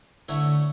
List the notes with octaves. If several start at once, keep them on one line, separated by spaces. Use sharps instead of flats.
D3 A3 E4 C#5